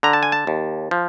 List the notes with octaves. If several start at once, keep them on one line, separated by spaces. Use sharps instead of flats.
D3 A#5
A5
G#5
A5
D#2
F3